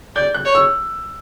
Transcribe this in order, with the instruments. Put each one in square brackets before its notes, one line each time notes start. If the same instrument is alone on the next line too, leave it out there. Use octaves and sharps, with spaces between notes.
[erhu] D5 [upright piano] G6
[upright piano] F#6
[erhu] C#5
[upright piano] E6